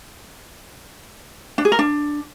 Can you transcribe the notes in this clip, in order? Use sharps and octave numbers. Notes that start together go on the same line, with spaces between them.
D4
G#4
A#4
D4